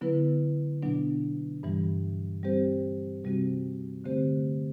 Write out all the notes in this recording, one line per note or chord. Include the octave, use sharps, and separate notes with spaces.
D3 F#3 B3 E4 B4
B2 F#3 B3 D4
G2 E3 G3
G3 C4 G4 C5
C3 G3 C4 F#4
D3 A3 C4 G4 C5